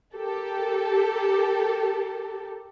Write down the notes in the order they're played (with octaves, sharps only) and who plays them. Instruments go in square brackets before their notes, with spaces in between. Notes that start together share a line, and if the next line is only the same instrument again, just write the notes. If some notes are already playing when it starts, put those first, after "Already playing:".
[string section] G4 A4 A#4